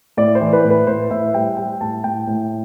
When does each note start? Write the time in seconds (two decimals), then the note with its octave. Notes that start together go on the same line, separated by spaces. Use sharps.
0.17 A2 D5
0.35 C5
0.41 E3
0.53 B4
0.64 A2
0.70 B4
0.87 A2 C5
1.11 A2 E5
1.34 G3 G5
1.57 G3 G5
1.81 A2 A5
2.04 A2 G5
2.27 A2